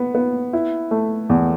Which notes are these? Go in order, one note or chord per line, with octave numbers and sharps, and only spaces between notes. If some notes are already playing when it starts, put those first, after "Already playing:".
Already playing: B3
B3
E4
A3
E2